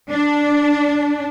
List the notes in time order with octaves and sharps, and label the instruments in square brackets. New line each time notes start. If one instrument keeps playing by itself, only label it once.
[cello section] D4